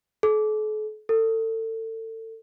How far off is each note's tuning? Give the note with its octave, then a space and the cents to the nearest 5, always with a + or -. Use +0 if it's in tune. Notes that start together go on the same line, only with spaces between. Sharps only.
A4 -45
A4 +30